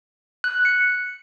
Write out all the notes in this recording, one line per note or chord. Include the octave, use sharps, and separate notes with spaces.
F#6
C#7